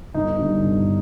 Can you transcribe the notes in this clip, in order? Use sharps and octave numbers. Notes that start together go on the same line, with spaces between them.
G1 D#4
G2 D3
G1